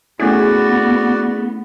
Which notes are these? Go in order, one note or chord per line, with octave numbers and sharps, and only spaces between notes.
A3 B3 C#4 E4 F#4 G#4 D5